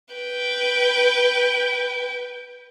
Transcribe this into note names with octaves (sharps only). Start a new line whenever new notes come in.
B4 G5